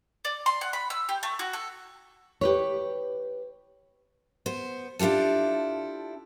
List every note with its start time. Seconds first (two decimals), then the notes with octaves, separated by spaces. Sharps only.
0.25 D5
0.46 C6
0.61 F#5
0.73 B5
0.90 E6
1.09 G4
1.23 A3
1.39 F#4
1.53 A4
2.41 G4 B4 C#5
4.46 B3 C5
4.99 D4 E4 F4 G4 A4